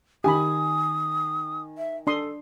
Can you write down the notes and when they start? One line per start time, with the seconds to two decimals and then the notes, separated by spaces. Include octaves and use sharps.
0.24 D#3 G4 G#5 B5 D#6
1.77 E5
2.07 D4 A4 C6 D#6